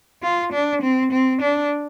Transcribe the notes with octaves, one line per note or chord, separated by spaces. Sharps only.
F4
D4
C4
C4
D4